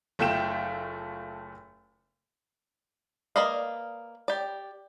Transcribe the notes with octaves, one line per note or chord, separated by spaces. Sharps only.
F#1 A3 F4 G5 E7
A#3 B4 D5 D#5 F5
G4 D5